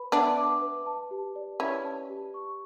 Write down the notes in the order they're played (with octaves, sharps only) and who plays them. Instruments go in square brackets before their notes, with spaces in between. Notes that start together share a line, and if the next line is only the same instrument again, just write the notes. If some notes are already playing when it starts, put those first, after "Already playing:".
Already playing: [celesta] B4 B5
[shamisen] B3 D4 [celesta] E5
[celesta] D6
B4
A5
G4
D5
[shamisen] C#4 E4 [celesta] B4
[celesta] A5
G4
C#6